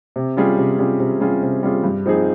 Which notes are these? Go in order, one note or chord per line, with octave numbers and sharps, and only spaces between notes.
C3
G3 C#4 F4 G#4
C3
G3 C#4 F4 G#4
C3
G3 C#4 F4 G#4
C3
G3 C#4 F4 G#4
G2
F3 C4 D#4 G#4